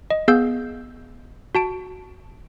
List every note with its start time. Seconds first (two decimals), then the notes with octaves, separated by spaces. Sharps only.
0.10 D#5
0.28 B3 G#4 F5 E6 G6
1.55 F#4 A5 D7